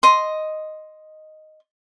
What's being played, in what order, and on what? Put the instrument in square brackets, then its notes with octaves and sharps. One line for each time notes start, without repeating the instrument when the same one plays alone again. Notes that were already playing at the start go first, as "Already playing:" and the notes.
[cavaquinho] D#5 C6